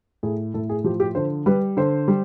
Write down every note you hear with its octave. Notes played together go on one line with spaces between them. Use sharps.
A2 G#4
A2 A4
G#4
F3 G4
G4
D3 C5
G3 B4
D3 C5
G3